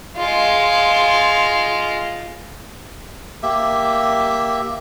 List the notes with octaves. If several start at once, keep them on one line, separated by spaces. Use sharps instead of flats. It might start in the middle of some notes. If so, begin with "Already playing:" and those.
G#3 F4
A#3 G4 E5